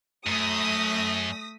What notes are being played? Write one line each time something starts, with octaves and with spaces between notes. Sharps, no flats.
F#2 A3 D#6 A#6 B6